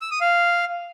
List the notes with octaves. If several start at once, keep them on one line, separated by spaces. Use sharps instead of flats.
E6
D#6
F5